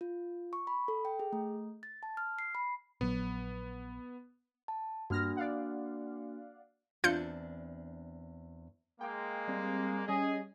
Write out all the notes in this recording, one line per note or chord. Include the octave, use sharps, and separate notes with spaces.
F4
C#6
B5
A4
G5
G#4
A3
A6
A5
F6
C7
B5
A#1 F#3 B3
A5
G2 A#3 D4 F#4 F6 A#6
D5 F5 F#5
E2 C4 D4 F4 G6 C#7
G#3 A#3 G5
G3 C4
G3 C#4 G#4 D#5